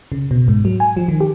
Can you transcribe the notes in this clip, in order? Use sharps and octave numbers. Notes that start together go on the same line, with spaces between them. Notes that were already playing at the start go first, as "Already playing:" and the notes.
C#3
B2
G#2
F#3
G#5
F3
D#3
G4